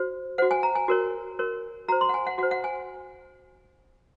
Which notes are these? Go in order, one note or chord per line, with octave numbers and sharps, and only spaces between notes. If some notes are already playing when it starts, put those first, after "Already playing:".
Already playing: F#4 C5
F#4 C5 F#5
G#5
A#5
G#5
F#4 A#4 C#5
F#4 A#4 C#5
F#4 C5 A#5
C6
F#5
G#5
F#5
F#4 C5 F#5
F#5
G#5